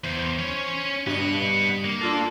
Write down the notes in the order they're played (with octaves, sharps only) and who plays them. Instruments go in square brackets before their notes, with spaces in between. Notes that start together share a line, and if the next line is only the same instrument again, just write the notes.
[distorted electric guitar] E2 [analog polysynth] C5
[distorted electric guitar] C#4 C#5
[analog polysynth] G2 F#6 [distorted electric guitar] B3 D#5
[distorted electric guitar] A#3
[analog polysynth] D4 F4 A4